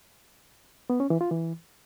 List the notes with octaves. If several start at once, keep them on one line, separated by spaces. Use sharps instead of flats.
B3
C#4
E3
F4
E3